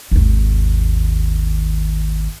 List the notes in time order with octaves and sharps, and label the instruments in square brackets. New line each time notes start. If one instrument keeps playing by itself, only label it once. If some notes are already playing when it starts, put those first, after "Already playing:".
[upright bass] G#1 D#2